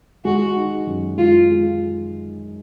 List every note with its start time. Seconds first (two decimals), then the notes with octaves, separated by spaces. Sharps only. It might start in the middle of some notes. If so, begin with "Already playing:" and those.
0.25 G#3 F#4
0.56 D#4
0.87 F#2
1.17 G#3 F4
1.49 G#3